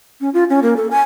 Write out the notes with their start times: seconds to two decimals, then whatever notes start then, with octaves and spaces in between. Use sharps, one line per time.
0.21 C#4
0.34 F4
0.50 C#4
0.63 A#3
0.77 A4
0.91 G#5